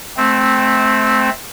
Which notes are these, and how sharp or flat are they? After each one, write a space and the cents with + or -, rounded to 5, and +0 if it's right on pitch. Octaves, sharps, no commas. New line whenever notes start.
A3 -20 C4 +0